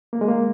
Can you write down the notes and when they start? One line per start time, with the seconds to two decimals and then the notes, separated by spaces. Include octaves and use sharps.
0.13 A#3
0.21 G#3
0.28 A#3